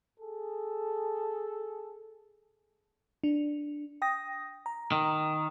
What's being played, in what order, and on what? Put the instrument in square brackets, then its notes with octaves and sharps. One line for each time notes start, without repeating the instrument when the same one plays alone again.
[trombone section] G#4 A4
[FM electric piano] D4
G5 D#6 A#6
A#5
[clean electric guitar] D#3